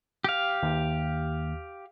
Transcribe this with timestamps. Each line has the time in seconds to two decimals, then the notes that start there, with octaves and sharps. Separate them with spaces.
0.24 G4 F5
0.63 D#2